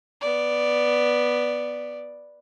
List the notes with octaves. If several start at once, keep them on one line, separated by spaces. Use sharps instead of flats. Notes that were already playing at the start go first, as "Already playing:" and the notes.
B3 D5